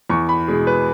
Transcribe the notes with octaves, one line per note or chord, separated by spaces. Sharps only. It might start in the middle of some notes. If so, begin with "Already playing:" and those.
E2 C#6
B5
B2 G#3 G#4
B4